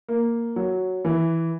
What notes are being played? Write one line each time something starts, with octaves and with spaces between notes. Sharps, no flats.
A#3
F#3
E3